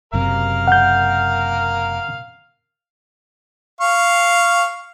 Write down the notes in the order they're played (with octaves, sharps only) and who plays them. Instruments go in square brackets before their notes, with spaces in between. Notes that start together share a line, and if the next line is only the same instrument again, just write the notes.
[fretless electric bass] F#1 F#2 C3 [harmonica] A#4 F5
[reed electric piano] F#5 G6
[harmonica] F5 C#6